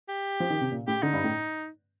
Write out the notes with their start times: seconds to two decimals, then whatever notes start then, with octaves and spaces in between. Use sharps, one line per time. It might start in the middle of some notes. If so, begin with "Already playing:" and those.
0.08 G4
0.40 F3
0.50 D#3
0.61 C3
0.72 A#2
0.87 A2 G4
1.02 D3 D#4
1.13 G2
1.24 A2